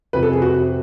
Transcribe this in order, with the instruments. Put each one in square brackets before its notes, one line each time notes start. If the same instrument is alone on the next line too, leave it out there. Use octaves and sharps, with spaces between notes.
[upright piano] F2 C3 F3 B4
A4
G#4
F#4